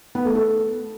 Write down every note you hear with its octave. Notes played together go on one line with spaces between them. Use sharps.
B3
A3
A4